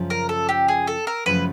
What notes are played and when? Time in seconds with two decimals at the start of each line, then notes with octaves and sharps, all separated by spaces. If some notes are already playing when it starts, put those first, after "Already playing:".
Already playing: F#2 C#3 F3
0.10 A#4
0.29 A4
0.49 G4
0.68 G#4
0.87 A4
1.07 A#4
1.26 F#2 C#3 F3 A3 B4